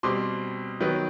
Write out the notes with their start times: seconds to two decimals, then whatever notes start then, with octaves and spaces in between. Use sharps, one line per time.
0.03 B2 G3 C4 C6 D6
0.80 D#3 F#3 B3